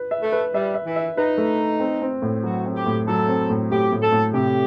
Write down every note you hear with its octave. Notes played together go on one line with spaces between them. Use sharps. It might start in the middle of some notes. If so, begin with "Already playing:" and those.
Already playing: B4
E5
A3
B4
G3 E5
E5
E3
E5
D#4 B4
A3
B4
C4
C4
A2
F#3 F#4
C4
G4
A2
F#3 A4
C4
A2
A2 G4
A2
A4
A2
C3 G4